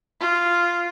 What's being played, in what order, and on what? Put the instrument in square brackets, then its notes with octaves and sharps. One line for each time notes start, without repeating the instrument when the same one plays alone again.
[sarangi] F4